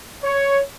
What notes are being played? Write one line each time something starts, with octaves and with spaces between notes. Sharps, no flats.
C#5